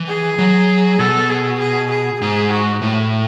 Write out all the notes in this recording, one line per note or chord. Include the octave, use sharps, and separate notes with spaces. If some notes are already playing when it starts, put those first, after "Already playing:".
Already playing: E3
G#4
F#3
B2 A4
G#4
G#4
G#4
G#2 G#4
F#4
A2